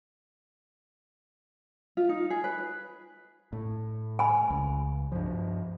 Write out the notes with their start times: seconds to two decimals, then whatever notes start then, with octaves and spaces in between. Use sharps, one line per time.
1.97 F4
2.09 D#4
2.30 G#4
2.44 B4
3.53 A2
4.19 G#5 B5
4.50 C#2
5.12 G2 F3